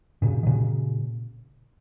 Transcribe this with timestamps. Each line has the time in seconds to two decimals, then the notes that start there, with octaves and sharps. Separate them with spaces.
0.22 A#2 C#3
0.43 D#3
0.47 A#2 C#3